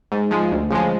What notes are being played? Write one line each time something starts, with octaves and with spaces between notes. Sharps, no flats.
G#2
F3 G#3
D2
C#3 F3 G#3